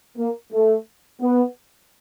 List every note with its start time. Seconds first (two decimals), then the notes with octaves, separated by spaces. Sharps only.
0.17 A#3
0.52 A3
1.21 B3